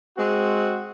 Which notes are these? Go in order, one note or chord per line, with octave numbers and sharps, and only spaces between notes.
G#3 C4 F#4